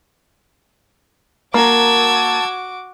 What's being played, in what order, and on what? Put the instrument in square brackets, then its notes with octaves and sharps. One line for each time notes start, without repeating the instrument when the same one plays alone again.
[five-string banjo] A#3 A#4 [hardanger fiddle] F#4 D6 [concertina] A5 [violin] E6 G#6